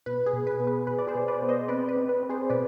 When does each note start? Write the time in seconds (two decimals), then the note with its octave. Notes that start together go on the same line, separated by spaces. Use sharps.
0.06 B2 B4
0.26 G#4
0.33 B2
0.47 B4
0.60 B3
0.67 B4
0.87 B2 B4
0.98 D5
1.07 G#4 C5
1.15 B2
1.28 B4 D5
1.42 B3
1.49 C5 D#5
1.68 C4 B4 D5
1.89 B4
1.96 C4
2.09 B4
2.23 C4
2.29 G#4 C5
2.50 B2 B4 D5